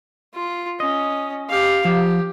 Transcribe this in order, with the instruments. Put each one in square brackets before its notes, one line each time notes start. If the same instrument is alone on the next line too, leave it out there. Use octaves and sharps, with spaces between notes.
[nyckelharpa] F4
[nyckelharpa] C#4 [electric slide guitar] D#5
[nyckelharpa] G4 F5
[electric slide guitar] F3 [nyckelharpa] G4